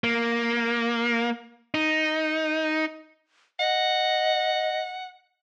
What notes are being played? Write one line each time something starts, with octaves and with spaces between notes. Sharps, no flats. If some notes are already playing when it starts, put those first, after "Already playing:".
A#3
D#4
D#5 F#5